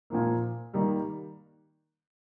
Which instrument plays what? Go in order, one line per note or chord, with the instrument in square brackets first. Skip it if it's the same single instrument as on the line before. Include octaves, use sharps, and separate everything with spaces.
[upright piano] A#2 F3 A#3
D#3 G3 A#3